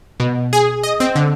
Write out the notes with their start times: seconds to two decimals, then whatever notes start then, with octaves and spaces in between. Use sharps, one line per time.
0.20 B2
0.53 G#4
0.83 D#5
1.00 C4
1.15 D3